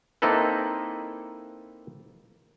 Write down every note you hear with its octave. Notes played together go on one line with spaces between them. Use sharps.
A#3 C4 D#4 E4 A4 B4